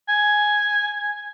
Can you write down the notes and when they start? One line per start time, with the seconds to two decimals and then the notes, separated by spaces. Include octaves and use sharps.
0.09 G#5